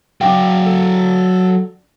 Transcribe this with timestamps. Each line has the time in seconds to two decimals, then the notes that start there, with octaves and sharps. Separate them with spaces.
0.21 F#3 D4 F#4 F5 G5
0.66 A4